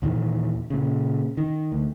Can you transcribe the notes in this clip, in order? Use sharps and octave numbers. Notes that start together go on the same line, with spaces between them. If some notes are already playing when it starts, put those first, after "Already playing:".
D#2 A#2 D#3 E3
A#2 C#3
D#3
D2